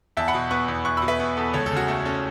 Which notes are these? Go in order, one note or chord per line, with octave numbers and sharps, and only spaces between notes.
E2 E5 A5
F#5 B5
B2
B3 C#6 F#6
E2
E2 C#6 F#6
B2 B5 E6
B4 E5
B3
E2 A4
C#2 A4 C#5
A4
C#3 F#4
A3 A4
C#4 A4